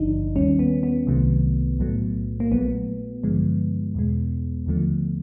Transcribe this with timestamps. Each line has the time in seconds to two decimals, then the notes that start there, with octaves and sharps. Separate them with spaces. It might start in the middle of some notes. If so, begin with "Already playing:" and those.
Already playing: G#1 G2 D3 F3 D4 D#4
0.36 D#2 D#3 G3 C#4
0.59 B3
0.83 B3
1.07 C2 C3 D#3 F#3 A3
1.79 B1 A2 F#3 A3
2.40 A#3
2.51 A#1 A#2 F#3 A3 B3
3.24 G2 D3 F3 G#3
3.95 E2 B2 G#3
4.66 D#2 D3 F3 A3